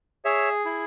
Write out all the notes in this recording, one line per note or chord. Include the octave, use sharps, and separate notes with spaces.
G#4 C#5 E5
E4